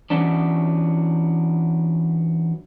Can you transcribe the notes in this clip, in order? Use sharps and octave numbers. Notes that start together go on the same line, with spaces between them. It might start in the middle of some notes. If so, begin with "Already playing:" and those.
E3 F#3 B3 C#4 D4